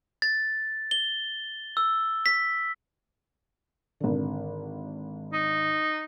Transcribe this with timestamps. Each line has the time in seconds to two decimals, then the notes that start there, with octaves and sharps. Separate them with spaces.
0.22 A6
0.91 G7
1.77 E6
2.26 B6
4.00 G#1 D3
5.33 D#4